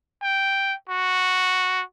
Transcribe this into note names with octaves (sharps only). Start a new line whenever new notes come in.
G5
F#4